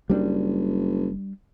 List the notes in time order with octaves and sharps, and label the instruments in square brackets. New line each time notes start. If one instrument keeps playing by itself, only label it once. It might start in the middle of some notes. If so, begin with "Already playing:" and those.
[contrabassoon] F#1 [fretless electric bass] G3 C4 D4